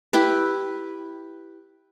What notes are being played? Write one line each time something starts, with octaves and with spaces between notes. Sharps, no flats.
E4 G4 B4